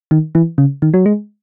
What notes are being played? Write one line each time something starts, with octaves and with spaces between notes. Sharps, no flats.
D#3
E3
C#3
D#3
F#3
G#3